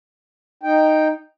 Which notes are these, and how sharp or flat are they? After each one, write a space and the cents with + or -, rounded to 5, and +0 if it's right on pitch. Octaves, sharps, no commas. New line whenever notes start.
D#4 -5 G5 +0